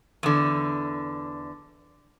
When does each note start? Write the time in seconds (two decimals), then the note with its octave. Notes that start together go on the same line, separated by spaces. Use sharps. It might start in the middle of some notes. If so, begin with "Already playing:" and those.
0.23 E2 D3